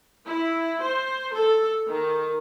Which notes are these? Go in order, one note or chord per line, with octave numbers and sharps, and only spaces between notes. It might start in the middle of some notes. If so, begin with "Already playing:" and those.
E4
C5
A4
D#3